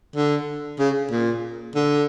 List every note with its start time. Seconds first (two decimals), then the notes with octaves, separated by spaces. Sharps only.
0.16 D3
0.79 C#3
1.11 A#2
1.75 D3